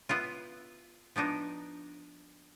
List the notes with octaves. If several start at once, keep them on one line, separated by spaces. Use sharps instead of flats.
B3 E4 F4
F3 B3 D4 D#4